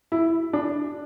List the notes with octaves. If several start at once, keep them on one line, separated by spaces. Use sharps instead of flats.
E4
D4